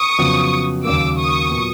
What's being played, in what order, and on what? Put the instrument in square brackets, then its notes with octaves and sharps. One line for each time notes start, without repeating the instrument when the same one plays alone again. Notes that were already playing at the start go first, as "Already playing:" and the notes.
Already playing: [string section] C#6 D#6
[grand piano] F2 C#3 F#3 B3
[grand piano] D#2 C#3 F#3 A#3 [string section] D6 E6
[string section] C#6 D#6
[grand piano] A#2 F#3 B3